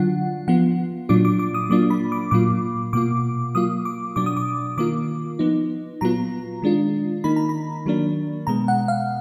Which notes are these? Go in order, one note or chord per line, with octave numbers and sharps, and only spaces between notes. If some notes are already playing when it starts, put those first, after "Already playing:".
Already playing: D3 F#3 D4 F4 F#5
F3 B3 F4 F#5
A#2 F#3 D4 F4 D6
D6
D6
D#6
F#3 A#3 D4 F4 D6
B5
D6
A#2 F#3 A#3 F4 D6
B2 A#3 F4 D6
F#3 A#3 F4 D#6
D6
B2 F#3 D4 D6
D#6
D6
D#3 A#3 F4 D6
F3 B3 D#4
A#2 F#3 B3 F4 A#5
D#3 G#3 D4 F4
D#3 A#3 D#4 B5
A#5
B5
D#3 F#3 A#3 D4
B2 G#3 B3 A#5
F#5
F5